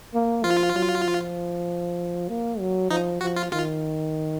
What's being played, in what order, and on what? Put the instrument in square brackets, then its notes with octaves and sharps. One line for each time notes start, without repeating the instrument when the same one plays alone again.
[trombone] A#3
[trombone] F3 [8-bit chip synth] F4
[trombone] F#3
F3
A#3
F#3
[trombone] F3 [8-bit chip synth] D#4
[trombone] F3 [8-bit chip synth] F#4
[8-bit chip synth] F4
[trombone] D#3 [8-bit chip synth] F4